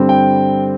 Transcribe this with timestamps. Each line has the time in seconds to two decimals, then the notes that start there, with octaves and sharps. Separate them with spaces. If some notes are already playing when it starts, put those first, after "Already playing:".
Already playing: G2 D3 G3 C4
0.09 G5